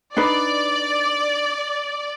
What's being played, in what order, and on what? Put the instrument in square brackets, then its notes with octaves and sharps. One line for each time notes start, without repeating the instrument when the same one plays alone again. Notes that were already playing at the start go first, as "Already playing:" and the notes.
[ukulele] D4 D#4 B4 [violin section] D5